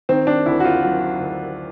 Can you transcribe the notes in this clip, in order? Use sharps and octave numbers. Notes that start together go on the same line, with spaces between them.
D#3 C4
D4
D2 E4
F#4
F4
F#3 F#4
D2